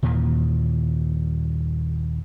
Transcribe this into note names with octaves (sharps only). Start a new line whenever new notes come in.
D#2 A#2 D#3 E3